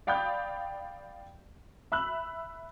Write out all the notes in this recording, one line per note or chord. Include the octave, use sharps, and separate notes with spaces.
D5 F5 G5 B5 D#6 G6
E5 B5 E6 F#6